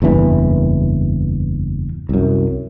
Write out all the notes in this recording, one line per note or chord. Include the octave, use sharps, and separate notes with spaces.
F#1 E2 G2 E3
C2 F#2